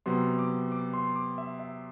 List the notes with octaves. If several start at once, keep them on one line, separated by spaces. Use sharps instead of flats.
C3 F#3 B3 C6
D6
D6
C6
D6
E5
E5